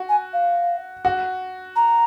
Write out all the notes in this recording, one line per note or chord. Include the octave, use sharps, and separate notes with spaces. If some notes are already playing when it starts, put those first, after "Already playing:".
Already playing: F#4
G#5
F5
F#4
A#5